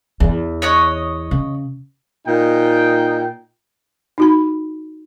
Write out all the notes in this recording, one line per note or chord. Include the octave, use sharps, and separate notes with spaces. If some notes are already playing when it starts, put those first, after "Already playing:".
E2
C#5 D#5 F#6
C#3
A#2 D#4 G5
D#4 F#4 B5